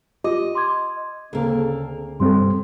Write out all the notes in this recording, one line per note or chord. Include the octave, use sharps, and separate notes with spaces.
F4 G4 D#5 D6
C6 D6 G#6
D2 C#3 A#3 C4 G#4 A4
G2 C3 G3 C4 A4 C6